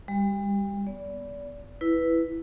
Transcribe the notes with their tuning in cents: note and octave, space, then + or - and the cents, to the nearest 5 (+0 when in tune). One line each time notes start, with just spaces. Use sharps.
G3 +35 G4 -20
B3 +0 D5 -30
E4 +0 B4 +0